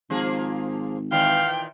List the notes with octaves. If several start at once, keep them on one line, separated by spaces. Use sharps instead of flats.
G#1 F3 A#3 G#4
A#2 D#3 E3 F5 G5